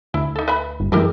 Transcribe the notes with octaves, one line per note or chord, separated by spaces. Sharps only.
D2 E4
D#4 A4
B4 E5 B5
G1
F#2 E3 G#3 C4 G4 A#4